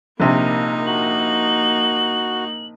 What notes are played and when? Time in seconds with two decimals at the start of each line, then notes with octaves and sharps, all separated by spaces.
0.20 A#1 C3 A#3 D#4
0.87 F#4 F#7